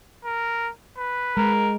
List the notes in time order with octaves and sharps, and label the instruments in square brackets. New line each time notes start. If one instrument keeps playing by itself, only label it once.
[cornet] A#4
B4
[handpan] G#3 [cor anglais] A#4